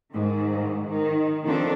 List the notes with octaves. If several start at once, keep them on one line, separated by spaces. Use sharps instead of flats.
G#2 D#3
D#3
D#3 F3 C4 D4 A4